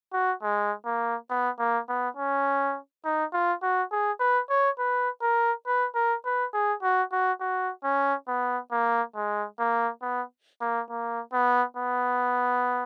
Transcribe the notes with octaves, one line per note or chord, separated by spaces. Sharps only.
F#4
G#3
A#3
B3
A#3
B3
C#4
D#4
F4
F#4
G#4
B4
C#5
B4
A#4
B4
A#4
B4
G#4
F#4
F#4
F#4
C#4
B3
A#3
G#3
A#3
B3
A#3
A#3
B3
B3